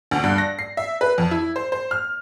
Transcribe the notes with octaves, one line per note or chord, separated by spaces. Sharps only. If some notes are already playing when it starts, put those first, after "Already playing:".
D2
G2
A#6
C7
E5
B4
F2
E4
C5
C5
F6